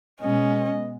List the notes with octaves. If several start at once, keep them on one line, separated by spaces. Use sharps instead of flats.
B2 G#3 B3 C#4 D#5